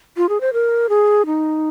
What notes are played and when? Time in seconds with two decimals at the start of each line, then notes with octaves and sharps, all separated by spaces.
0.17 F4
0.29 G#4
0.41 C5
0.53 A#4
0.89 G#4
1.26 D#4